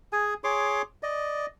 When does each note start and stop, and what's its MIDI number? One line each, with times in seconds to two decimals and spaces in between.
0.13 0.34 68
0.13 0.34 80
0.44 0.82 68
0.44 0.82 73
0.44 0.82 84
0.44 0.82 86
1.03 1.46 74
1.03 1.46 75